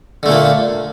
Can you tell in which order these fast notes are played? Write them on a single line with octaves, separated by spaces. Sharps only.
D3 A3 A#2 A#3